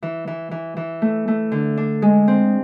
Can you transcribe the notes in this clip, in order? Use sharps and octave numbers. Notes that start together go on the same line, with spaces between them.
E3
E3
E3
E3
A3
A3
D3
D4
G#3
C4